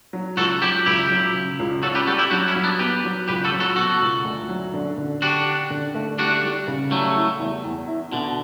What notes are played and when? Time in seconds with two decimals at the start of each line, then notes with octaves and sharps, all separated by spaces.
0.13 F#3
0.37 C#2 F#4 A4
0.62 F#3 E4 G4
0.86 C#2 E4 G4
1.10 F#3
1.34 C#3
1.59 C#2
1.83 C#4 F#4 A4
1.95 G4 B4
2.07 G3 F#4 A4
2.19 E4 G4
2.31 F#3 D4 F#4
2.47 C#4 E4
2.56 F#3
2.64 B3 D4
2.79 B3 G4 B4
3.04 F#3
3.28 C#2 G4 B4
3.44 F#4 A4
3.52 F#3
3.60 F#4 A4
3.76 B2 F#4 A4
4.01 C#2
4.24 D2
4.49 F#3
4.74 D3
4.97 D3
5.22 D4 F#4 G4
5.46 G4
5.70 D3
5.94 A3
6.19 G3 D4 F#4
6.43 G3
6.67 C#3
6.91 F#3 G3 A3
7.15 E4
7.39 E2
7.64 E2
7.88 E4
8.12 B2 D3